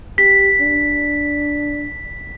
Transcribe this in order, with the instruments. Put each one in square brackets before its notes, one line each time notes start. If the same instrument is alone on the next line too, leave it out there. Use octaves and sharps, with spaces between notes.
[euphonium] G4 [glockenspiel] B6
[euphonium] D4